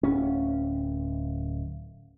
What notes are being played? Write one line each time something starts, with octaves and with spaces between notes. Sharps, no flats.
D1 C#4